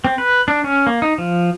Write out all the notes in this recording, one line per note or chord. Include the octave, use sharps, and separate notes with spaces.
C4
B4
D4
C#4
A#3
D#4
F3